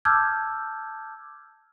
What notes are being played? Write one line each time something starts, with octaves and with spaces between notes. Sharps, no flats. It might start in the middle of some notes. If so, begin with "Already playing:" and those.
A5 D6 E6 F6 G6 G#6